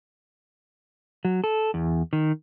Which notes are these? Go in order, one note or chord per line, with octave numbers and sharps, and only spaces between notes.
F#3
A4
E2
D#3